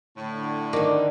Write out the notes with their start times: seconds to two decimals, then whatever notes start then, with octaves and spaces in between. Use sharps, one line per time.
0.17 A2 D3
0.73 D#3 C4 D5